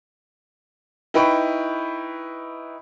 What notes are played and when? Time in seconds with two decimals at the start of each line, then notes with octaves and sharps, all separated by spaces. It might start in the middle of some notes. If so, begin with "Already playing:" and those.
1.14 D#4 E4 B4 G5 B5 C#6